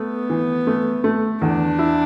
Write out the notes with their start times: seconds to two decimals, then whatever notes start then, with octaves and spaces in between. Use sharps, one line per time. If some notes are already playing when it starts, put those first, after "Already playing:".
Already playing: A3 B3
0.30 E3
0.67 A3
1.04 A3
1.42 E2 D4
1.79 E4